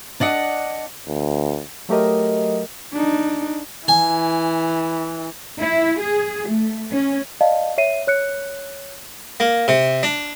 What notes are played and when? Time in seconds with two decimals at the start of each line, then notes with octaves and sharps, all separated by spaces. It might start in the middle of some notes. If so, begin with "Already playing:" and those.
0.20 D4 D5 D#5 F#5
1.07 D2
1.89 F#3 A3 G4 A#4 D#5
2.93 D4 D#4
3.88 E3 G#5
5.60 E4
5.99 G#4
6.48 A3
6.91 C#4
7.41 D5 D#5 F5 A5
7.78 C#5 E5 C7 D#7
8.07 C#5 F#6 C#7
9.40 A#3
9.68 C3
10.03 D4